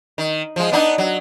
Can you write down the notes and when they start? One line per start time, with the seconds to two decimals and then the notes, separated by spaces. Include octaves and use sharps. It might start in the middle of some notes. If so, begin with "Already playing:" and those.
0.18 D#3
0.56 F3 G#3
0.72 B3 D4 D#4
0.98 F#3